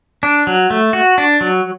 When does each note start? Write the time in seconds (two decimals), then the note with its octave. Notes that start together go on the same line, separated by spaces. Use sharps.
0.23 D4
0.47 F#3
0.70 A3
0.93 F#4
1.18 D4
1.41 F#3